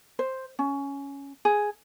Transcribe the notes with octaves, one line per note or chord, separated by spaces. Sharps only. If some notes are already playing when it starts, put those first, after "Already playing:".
C5
C#4
G#4